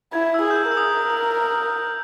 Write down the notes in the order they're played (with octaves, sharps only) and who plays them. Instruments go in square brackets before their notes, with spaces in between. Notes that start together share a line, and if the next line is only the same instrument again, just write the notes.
[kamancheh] E4 [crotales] G#6
[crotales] E6
[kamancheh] G#4
[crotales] G6
E6
[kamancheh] A#4 [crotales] E6
[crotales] D#6
D#6